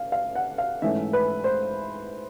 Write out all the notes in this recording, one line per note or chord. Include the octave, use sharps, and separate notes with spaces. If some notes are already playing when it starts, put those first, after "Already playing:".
Already playing: F5
F5
F#5
F5
G#2 E3 A3 C#4 E5
B4
C5